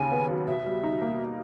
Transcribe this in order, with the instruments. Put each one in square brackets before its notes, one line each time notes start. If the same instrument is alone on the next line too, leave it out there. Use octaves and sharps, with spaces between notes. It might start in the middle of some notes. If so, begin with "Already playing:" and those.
Already playing: [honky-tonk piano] D#2 C#3 [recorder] G#5
[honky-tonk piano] B3
F#3
[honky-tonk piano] B2 [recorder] E5
[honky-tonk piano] G3
D#4
A#3